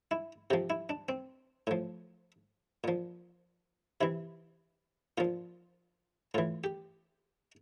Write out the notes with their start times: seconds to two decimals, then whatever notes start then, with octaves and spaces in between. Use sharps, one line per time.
0.11 E4
0.50 C3 F3 G4
0.70 E4
0.89 D4
1.09 C4
1.67 A2 F3
2.84 A#2 F3
4.01 C3 E3 E4
5.18 A#2 F3 F4
6.34 A2 E3 F4
6.64 G4